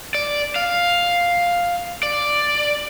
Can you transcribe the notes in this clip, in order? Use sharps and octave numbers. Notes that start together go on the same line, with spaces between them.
D5
F5
D5